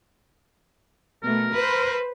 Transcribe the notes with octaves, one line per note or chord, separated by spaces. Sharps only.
B2 A3 A#4
B4 C5